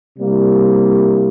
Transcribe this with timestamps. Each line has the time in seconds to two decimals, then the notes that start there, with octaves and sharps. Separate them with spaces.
0.18 C3 G3 A#3 E4